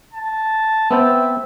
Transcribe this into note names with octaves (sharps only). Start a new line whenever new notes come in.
A5
B3 C4 E5 G5